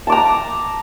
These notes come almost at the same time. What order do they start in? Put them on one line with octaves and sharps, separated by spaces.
A5 D6 A#5